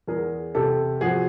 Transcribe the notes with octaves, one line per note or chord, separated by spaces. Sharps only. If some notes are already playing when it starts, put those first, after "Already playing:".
E2 G#4 A#4
C3 G4 A4
F3 F#4 G#4